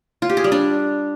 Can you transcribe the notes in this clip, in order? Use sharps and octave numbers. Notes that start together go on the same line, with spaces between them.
F4
G4
G#4
G3
D4